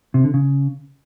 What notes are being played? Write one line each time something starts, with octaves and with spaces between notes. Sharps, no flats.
C3
D3
C#3